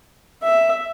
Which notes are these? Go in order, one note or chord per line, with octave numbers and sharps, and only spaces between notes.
E5